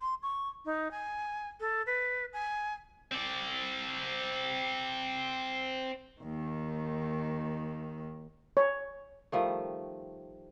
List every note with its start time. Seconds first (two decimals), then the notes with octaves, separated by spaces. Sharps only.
0.01 C6
0.23 C#6
0.66 D#4
0.91 G#5
1.60 A4
1.86 B4
2.33 G#5
3.11 C4 D5
6.21 D#2 D#3
8.57 C#5
9.32 D#3 F3 G3 A3